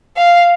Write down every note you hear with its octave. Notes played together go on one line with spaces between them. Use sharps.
F5